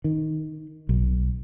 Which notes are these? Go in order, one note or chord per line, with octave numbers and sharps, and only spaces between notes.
D#3
B1